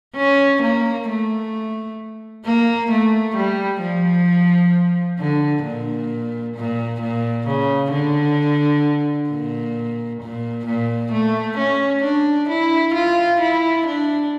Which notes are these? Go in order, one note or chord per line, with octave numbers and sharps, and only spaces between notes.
C#4
A#3
A3
A#3
A3
G3
F3
D3
A#2
A#2
A#2
C#3
D3
A#2
A#2
A#2
A3
C#4
D4
E4
F4
E4
D4